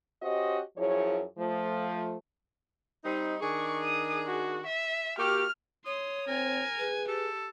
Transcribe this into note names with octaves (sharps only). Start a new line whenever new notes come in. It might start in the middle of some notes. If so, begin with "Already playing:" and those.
C#4 F#4 G4 C5 D#5
F#2 F3 E4 G#4 C#5
F3 A3
G3 C4 D#4
D#3 D4 G#4 C#6
D#6
F#4
E5
A#3 F#4 G4 F6
C#5 C6 D#6
C4 A#4 G#5
G#4 B4
G4 A4